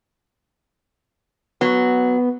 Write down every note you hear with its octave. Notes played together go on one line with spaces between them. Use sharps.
F#3 B3